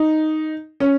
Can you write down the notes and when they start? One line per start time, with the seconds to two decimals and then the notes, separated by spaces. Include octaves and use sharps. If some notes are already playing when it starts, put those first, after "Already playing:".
Already playing: D#4
0.80 C#4